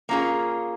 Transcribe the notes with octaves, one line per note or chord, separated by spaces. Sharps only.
A#3 C#4 F4 G#4